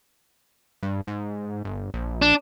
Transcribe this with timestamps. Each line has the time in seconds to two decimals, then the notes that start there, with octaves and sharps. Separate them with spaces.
0.83 G2
1.07 G#2
1.65 G1
1.94 A#1
2.22 D4